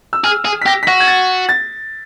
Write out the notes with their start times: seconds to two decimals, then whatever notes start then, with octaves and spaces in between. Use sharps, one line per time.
0.13 E6
0.24 G#4 F6
0.45 G#4
0.62 B6
0.66 G4 A#6
0.83 B6
0.87 F#4 A#6
1.00 G#6
1.07 A6
1.49 A6